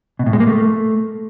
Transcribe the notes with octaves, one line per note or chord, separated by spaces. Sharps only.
B2
A2
G#3
A#3
A3